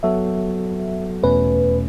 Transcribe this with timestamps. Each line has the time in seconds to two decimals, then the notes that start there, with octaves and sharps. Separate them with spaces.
0.03 F#3 B3 F#4 A4 E5
1.23 E2 B2 A3 C#4 B4